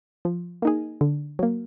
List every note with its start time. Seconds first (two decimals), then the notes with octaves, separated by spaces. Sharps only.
0.25 F3
0.62 A#3 D#4 G#4
1.01 D3
1.39 F#3 A#3